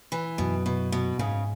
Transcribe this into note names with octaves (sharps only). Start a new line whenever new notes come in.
E3
F#2 B2
B2
B2
G#2 C#3